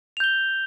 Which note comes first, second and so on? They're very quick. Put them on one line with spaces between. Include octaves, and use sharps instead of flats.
F7 G6 G7